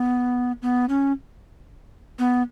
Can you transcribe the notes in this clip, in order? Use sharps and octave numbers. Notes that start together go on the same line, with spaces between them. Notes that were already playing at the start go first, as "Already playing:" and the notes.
Already playing: B3
B3
C#4
B3